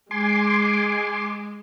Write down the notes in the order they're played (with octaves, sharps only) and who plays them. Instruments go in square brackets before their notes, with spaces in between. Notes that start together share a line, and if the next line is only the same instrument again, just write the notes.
[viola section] G#3 [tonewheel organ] G#5 C6 D6